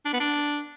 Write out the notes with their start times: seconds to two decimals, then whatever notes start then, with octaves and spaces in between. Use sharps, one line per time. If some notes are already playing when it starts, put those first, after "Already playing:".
0.05 D4
0.13 B3
0.20 D4